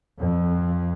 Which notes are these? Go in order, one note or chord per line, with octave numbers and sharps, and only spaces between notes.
F2